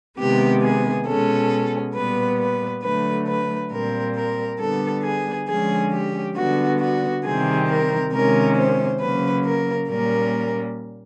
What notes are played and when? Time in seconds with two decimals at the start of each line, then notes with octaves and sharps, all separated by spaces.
0.18 C3 D#3 G#3 B3 G4
0.62 G#4
1.06 B2 G#3 C#4 A4
1.95 A#2 G3 B3 B4
2.39 B4
2.83 D3 F#3 A3 B4
3.27 B4
3.71 A#2 G3 C4 A#4
4.15 A#4
4.59 D3 G3 B3 A4
5.03 G#4
5.48 D3 F3 G#3 C#4 G#4
5.92 G4
6.36 D3 G3 B3 F#4
6.80 F#4
7.23 C3 D#3 G3 C4 G#4
7.68 A#4
8.12 C3 D#3 G#3 C#4 A#4
8.56 C5
9.00 C#3 F#3 A#3 B4
9.44 A#4
9.88 A#2 G3 A#3 C#4 A#4